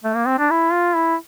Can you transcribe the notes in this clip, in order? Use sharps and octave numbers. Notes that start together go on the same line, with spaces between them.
A3
A#3
C4
D4
E4
F4
E4